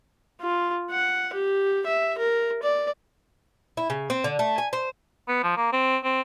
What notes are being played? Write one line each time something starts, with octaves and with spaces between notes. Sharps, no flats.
F4
F#5
G4
E5
A#4
D5
E4
C#3
C4
D3
A3
G#5
C5
B3
F3
A#3
C4
C4